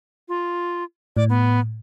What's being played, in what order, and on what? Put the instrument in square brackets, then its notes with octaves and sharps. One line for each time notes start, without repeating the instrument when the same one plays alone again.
[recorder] F4
[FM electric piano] A2 [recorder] D5
[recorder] B3